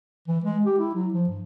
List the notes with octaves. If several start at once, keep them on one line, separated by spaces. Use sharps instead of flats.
E3
G#3
G4
E4
F#3
F3
G2